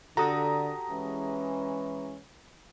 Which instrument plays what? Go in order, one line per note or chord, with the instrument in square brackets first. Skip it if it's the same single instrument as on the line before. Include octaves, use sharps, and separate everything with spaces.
[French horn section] D3 [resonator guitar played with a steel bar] F#4 G4 A4 [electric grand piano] A#5 D#6
[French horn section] E3 G#3 C#4